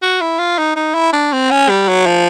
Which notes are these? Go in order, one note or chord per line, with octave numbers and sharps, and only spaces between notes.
F#4
E4
F4
D#4
D#4
E4
D4
C4
C#4
G3
F#3
F3